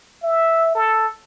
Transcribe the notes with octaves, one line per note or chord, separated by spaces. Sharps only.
E5
A4